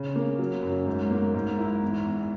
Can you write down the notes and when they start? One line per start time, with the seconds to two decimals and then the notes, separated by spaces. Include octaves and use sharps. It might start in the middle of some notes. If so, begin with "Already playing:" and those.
Already playing: C#3
0.16 A#3
0.39 F#3
0.63 F#2
0.86 G#2
1.11 A#3
1.34 G#2
1.59 E4
1.82 E2
2.05 E2